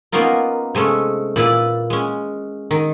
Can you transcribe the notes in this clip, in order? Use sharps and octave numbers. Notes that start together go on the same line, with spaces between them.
A#3 B3 C#4 D#4 F4 A#4
C3 G#3 A3 C#4
A#2 E4 B4 D5
G#3 C#4
D#3